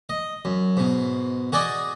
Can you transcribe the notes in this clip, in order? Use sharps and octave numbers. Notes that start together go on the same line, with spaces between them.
D#5
F#2
G#2 B2
F#4 G#4 D5 D#5